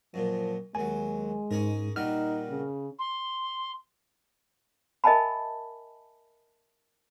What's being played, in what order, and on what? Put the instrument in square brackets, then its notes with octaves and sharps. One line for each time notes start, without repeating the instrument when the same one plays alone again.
[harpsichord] F#2 A#2 [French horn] F3
[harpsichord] D#2 F#3 [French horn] G#3 [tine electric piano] G#5
[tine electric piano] G#2 [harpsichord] C#4 G#4 A#4
[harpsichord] A#2 G3 F#4 [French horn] D#4 [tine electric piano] F6
[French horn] C#3
[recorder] C6
[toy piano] A#4 D#5 E5 G#5 A5 B5